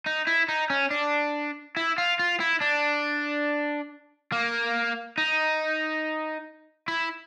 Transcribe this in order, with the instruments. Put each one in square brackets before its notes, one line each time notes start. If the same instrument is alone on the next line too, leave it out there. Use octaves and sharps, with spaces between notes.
[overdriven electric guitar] D#4
E4
D#4
C#4
D4
E4
F4
F4
E4
D4
A#3
D#4
E4